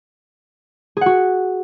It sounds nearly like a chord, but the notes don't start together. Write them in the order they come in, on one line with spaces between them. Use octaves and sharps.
G#4 F#5 F#4